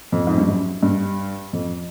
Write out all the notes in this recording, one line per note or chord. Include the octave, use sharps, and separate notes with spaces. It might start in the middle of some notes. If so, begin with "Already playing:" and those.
F2
G#2
G2
F#2
G2
F2